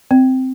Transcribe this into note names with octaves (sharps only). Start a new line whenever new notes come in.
C4